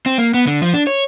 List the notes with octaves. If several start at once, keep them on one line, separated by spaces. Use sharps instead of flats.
C4
A#3
B3
D3
F3
D4
C#5